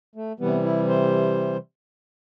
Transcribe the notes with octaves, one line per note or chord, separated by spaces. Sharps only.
A3
C3 E3 G3 B3
E4
C5